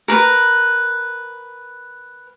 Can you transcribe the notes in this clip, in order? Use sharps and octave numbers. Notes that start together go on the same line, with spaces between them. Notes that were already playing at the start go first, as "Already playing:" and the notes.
A#4 B4